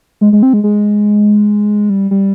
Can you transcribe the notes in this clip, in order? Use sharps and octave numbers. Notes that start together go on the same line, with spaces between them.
G#3
G#3
C4
G#3
G#3
G3
G3